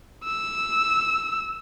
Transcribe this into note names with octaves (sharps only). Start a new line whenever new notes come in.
E6